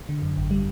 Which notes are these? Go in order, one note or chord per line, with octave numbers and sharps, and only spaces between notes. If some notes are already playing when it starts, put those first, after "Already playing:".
D3
F#2
G#1
G3